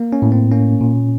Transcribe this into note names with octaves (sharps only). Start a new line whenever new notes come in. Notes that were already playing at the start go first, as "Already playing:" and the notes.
Already playing: A#3
C#4
A2
C4
A#3 C#4
A#2